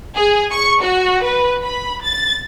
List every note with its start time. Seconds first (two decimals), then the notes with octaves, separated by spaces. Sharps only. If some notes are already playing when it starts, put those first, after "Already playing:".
0.16 G#4
0.51 C#6
0.82 F#4
1.24 B4
1.63 B5
2.04 A6